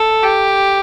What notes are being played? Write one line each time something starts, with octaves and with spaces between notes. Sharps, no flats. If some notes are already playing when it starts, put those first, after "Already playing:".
Already playing: A4
G4